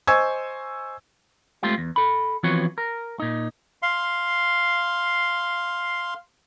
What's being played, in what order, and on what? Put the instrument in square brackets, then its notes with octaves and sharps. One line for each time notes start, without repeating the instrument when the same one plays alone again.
[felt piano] C5 D#5 G#5 C#6 E6 G#6
[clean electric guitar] G#3 A3 C4 F4 G4 F5
E2
A4 B5
E3 F3 B3 C4 F#4 C#5
A#4
A#2 D#4
[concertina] F5 C6